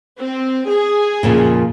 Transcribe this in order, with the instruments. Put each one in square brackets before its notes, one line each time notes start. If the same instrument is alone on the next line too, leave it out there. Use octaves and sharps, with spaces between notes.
[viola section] C4
G#4
[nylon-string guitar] F2 A#2 C#3